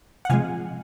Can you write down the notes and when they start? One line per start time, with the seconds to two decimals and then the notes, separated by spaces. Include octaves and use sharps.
0.25 F#5
0.30 C3 F3 G#3 F5 G#5